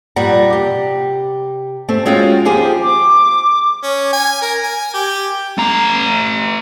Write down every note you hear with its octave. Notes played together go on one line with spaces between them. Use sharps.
F2 A#2 G3 G4 F#5 A#5
C3 G4
A3 C4
G#3 C#4 F4 F#4 G5
D#2 F3 G4 G#4 C5
D6
C#4
G#5
A#4
G#5
G4
A3 A#5